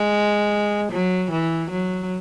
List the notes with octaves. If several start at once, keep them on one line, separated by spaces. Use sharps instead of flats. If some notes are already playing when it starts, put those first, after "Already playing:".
Already playing: G#3
F#3
E3
F#3